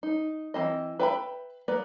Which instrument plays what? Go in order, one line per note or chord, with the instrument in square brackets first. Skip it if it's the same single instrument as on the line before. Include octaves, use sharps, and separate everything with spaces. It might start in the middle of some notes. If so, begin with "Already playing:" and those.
[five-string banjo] D#4
E3 F#3 C4 D#5
B4 E5 G5 A5 B5
A#3 B3 B4 D5